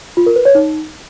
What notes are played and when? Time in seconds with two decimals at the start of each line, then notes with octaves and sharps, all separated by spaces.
0.17 F4
0.26 A#4
0.36 B4
0.45 C#5
0.55 D#4